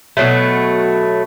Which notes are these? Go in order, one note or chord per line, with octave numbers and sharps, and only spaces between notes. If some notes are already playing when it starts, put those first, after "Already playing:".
B2 D#3 F#3 A3